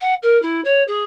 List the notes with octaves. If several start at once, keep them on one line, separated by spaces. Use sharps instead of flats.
F#5
A#4
E4
C#5
G#4